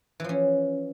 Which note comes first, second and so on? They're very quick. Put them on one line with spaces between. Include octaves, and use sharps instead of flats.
E3 F3 C#4